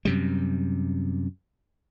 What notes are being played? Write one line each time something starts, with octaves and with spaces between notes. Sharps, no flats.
F#2 C3 G3